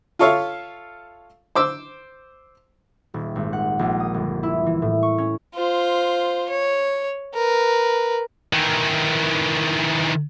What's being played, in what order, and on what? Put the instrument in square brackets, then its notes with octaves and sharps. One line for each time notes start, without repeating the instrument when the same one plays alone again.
[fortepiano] F4 A4 C#5 E5 F5
C5 D6 E6
[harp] D#1
G#1
F#5
A#1
D#6
G1
E4
E3
A2
C#6
C#4
[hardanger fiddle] F4 C5
C#5
A#4 B4
[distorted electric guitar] D#3 E3